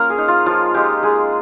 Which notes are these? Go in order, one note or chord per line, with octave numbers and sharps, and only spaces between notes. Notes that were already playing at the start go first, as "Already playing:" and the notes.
Already playing: A#3 C#4 F4 A#4
G#4
D#4
F4
F3 F4
G#3 D#4 G4
G#3 G#4